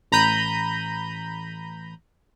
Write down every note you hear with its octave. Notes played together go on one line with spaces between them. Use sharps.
A1 A#5 B5 G6 D#7